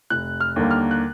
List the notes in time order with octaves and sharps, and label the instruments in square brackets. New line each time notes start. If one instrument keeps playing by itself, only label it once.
[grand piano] F1 F#6
F6
D#2 D3 G3 A#3
F6
F#6